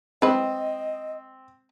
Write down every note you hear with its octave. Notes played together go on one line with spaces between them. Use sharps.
G#3 C4 B4 D#5